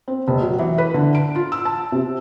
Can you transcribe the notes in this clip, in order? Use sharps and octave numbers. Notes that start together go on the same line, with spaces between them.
C4
F1
F#3
E3
B4
D3
D7
F4
E6
A5
C3